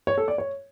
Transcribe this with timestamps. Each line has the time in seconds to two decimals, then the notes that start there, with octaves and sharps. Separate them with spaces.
0.07 C#5
0.18 A4
0.28 D5
0.38 C#5